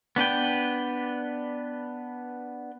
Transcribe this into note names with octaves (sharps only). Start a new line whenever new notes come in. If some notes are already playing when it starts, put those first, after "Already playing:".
B3 D4 B4 G5